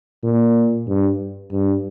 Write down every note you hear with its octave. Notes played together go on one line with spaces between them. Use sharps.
A#2
G2
G2